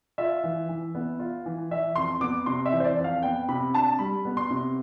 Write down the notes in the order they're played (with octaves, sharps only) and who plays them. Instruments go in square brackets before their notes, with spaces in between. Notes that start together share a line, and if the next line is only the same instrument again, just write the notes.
[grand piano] F4 E5
E3
E3
B3
F4
E3
E3 E5
F2 C6
B3 D6
C3 C6
E5
E3
C5
D5
F2
F5
B3 G5
C3 B5
D4 A5
G3 B5
B3
C6
C3